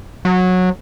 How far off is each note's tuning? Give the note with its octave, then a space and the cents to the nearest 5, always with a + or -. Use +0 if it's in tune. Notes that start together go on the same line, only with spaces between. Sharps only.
F#3 -15